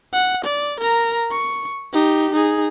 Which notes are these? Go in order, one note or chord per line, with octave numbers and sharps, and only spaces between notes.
F#5
D5
A#4 A#5
C#6
D#4 G4
D#4 G#4